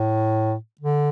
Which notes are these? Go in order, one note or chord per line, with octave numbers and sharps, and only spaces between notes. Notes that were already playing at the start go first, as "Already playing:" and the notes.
Already playing: A2
D3